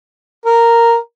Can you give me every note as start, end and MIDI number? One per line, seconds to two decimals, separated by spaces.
0.46 0.96 70